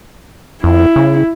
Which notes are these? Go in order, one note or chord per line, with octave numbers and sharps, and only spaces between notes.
F2 E4
C#3